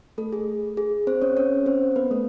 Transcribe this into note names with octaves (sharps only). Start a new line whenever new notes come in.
A3 A4
G#4
G#4
C4 C5
C#4 C#5
C#4 C#5
C4 C5
B3 B4
A3 A4